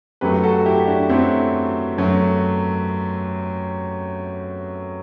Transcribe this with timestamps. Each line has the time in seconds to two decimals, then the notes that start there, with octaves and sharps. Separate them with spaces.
0.21 F#2 F#3 A3 G4 B4
0.43 F#4 A4
0.66 E4 G4
0.87 D4 F#4
1.10 F#2 F#3 A3 C4 E4
1.98 F#2 F#3 A3